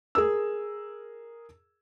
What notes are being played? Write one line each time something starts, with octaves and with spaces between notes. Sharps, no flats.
G#4 A#4 E6